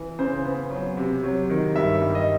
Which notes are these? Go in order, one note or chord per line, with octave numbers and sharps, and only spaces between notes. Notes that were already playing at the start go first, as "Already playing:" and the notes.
Already playing: E3
C#3 C5
B3
F#3
C3
F#3
D#3
G2 E5
G3
D#5